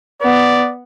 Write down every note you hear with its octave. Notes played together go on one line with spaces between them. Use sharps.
B3 D5